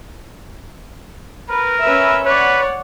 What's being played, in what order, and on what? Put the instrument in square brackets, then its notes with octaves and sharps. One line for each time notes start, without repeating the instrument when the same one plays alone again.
[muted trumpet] A#4 [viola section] B4
[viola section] C#4 B4 E5
[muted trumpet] B4 [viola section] C#5 D5 F#5